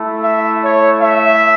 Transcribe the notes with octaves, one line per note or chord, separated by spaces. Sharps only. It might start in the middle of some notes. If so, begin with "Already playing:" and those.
Already playing: A3 E4
E5
C#5
E5